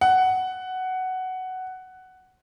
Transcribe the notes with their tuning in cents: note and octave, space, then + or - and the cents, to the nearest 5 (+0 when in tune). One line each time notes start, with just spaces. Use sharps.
F#5 +10